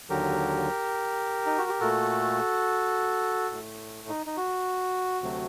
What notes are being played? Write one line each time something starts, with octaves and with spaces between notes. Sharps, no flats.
D#2 D3 F#3 G4 A#4
D#4
F#4
G4
A#2 A3 F#4 A4
A2 A3
D#4
D#4
F#4
D2 C3 F#3 A3